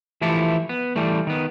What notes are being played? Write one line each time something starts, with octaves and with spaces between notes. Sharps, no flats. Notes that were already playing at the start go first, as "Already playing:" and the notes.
E3 F3 A3 E4 G4 A4
B3
E3 G3 A3
D#3 B3